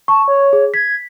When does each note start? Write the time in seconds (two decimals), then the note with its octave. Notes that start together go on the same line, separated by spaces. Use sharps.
0.08 A5 C#6
0.28 C#5
0.53 G#4
0.74 G#6 B6